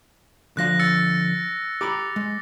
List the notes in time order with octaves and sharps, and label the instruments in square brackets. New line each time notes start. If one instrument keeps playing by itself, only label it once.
[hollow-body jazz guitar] D3 F3 F5 [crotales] F#6 A#6
[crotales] E6 A6 C#7
[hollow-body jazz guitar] G4 A#5 B5 [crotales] D6
[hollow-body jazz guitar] G#3